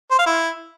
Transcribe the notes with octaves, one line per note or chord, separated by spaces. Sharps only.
C5
F5
E4